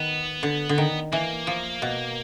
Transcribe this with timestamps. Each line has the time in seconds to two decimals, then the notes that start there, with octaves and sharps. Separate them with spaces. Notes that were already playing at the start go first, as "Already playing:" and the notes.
Already playing: D#3 B3
0.43 D3
0.69 D3
0.78 D#3
1.12 E3 A#3
1.47 F3
1.82 B2